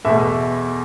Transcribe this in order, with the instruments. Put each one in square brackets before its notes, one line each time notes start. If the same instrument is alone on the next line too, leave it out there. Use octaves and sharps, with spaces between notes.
[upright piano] E2 B2 A3 E5